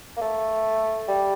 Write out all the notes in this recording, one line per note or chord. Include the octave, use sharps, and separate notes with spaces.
A#3
A3
G3